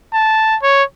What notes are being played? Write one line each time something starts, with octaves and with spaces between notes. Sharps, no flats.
A5
C#5